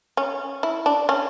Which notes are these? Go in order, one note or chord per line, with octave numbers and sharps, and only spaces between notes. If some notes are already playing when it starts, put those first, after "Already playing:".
C#4
E4
D4
C#4